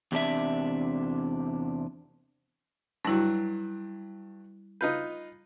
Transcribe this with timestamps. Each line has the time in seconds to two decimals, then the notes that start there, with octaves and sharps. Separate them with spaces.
0.12 E2 C3 D4 E5
3.05 G2 F#3 G3 E4
4.81 D#4 F4 B4 G6